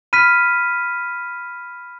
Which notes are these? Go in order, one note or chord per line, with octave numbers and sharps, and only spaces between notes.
B5 F6 B6 D#7